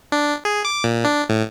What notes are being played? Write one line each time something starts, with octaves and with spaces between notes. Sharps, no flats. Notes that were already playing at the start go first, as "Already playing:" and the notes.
D4
G#4
D6
A#2
D4
A2